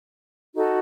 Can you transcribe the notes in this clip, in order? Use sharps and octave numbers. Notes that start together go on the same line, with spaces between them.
D#4 F#4 A4